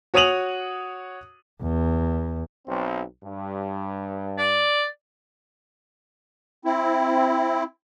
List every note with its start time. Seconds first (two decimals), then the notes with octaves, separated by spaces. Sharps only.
0.14 F#4 C#5 D#6 D#7 F7 F#7
1.62 E2
2.66 B1 C4
3.24 G2
4.38 D5
6.65 C4 E4